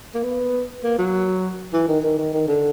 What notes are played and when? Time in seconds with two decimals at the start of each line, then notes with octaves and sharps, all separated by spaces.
0.14 A#3
0.23 B3
0.84 A#3
0.98 F#3
1.73 E3
1.88 D#3
2.03 D#3
2.18 D#3
2.33 D#3
2.48 D3